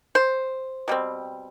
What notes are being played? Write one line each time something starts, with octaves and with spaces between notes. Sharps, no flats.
C5
B2 G3 C4